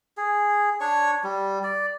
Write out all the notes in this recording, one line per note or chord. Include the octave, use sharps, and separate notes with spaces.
G#4
D4 C#5 C#6
G3
D5